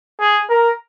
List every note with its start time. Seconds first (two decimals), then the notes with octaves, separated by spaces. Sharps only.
0.21 G#4
0.49 A#4